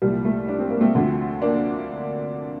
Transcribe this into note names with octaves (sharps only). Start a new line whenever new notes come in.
C2 A#2 F3 G3
A3
D4
C4
A#3
A3 C4
D2 D3 F3
A#3 D4